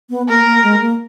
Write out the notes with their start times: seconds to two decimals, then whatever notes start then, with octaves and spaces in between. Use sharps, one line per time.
0.10 B3
0.28 A#3 A#4
0.45 A#3
0.63 G#3
0.81 A#3